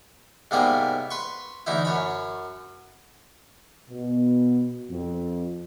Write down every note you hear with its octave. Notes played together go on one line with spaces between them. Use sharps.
G#2 C3 G3 A#3 B3 G#4
B4 C6 C#6
D2 E3 D#4 E4
F#2 C#5 B5
B2
F2